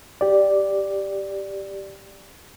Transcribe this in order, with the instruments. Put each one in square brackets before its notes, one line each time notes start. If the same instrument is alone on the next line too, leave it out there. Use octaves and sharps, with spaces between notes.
[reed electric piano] G4 D5